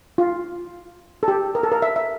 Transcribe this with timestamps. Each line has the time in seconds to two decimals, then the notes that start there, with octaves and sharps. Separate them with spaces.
0.18 F4
1.23 A4
1.28 G4
1.55 A#4
1.63 A4
1.72 A#4
1.82 E5
1.96 E5